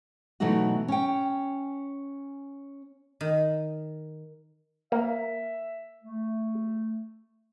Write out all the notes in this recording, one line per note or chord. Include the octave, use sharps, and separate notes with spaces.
B2 E3 F#3 A3 D#4 F#4
C#4 G5
D#3
A#3 E5
A3